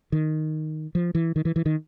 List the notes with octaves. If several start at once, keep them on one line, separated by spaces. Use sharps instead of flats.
D#3
F3
E3
D#3
E3
E3
D#3